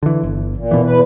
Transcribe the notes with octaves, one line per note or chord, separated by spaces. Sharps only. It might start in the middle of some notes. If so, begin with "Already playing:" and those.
D3 E3
G1
A#2
B2 E3
E2 B4